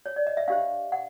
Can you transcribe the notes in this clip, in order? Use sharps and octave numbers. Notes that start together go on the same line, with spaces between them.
C#5
D5
D#5
E5
D4 G4 C5 F5
F#5